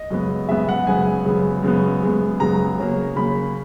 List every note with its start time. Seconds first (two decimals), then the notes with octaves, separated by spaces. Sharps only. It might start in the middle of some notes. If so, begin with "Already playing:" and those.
Already playing: D#5
0.10 F#2 C#3 G#3 B3
0.49 F#2 C#3 G#3 B3 E5
0.69 F#5
0.87 F#2 C#3 G#3 B3 G#5
1.25 F#2 C#3 G#3 B3
1.63 F#2 C#3 G#3 B3
2.02 F#2 C#3 G#3 B3
2.40 F#2 C#3 G#3 B3 A#5
2.78 C#3 F#3 A#3
3.16 C#3 F#3 A#3 B5